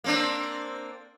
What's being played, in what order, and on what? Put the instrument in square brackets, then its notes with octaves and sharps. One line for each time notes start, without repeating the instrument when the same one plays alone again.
[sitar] A#3 C4 D4